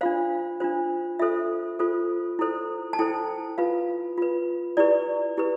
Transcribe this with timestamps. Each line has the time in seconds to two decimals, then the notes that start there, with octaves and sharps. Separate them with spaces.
0.01 D4 F4 C5 F5
0.60 D4 F4 C5
1.19 F4 A4 C5 E5
1.79 F4 A4 C5
2.39 E4 A4 C5
2.93 A5
2.99 E4 A4 C5 G5
3.58 F4 B4 F5
4.18 F4 B4
4.77 E4 G4 B4 D5
5.37 E4 G4 B4